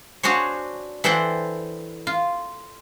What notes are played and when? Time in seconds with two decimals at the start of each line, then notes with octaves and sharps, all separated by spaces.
0.23 D4 F#4 G#4 C5 C#5
1.04 E3 A4 C5 F#5 G5
2.07 F4